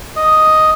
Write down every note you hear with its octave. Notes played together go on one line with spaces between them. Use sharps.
D#5